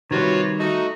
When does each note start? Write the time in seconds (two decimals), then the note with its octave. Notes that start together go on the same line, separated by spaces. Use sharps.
0.11 C3 D#3 G3 F4 F#4 B4 C#5
0.59 A3 D#4 F#4